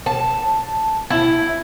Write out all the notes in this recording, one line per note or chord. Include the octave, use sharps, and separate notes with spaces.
A5
E4